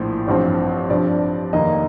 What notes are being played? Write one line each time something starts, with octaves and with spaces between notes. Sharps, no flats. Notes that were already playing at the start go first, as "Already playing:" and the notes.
Already playing: A#1 A2 F3 C5
A1 G2 F3 C4
G2 F3 C4 D5
F1 D#2 D#3 A#3 D#5